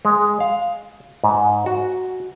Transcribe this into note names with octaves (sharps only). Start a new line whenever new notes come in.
G#3
F5
G#2
F#4